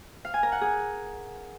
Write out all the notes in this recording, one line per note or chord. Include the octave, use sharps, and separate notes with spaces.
F5
G#5
A#4
F#5
G#4